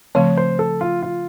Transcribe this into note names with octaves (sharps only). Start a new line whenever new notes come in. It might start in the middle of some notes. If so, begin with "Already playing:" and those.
C#3 F3 A3 C4 C#5
C5
A4
F4
F4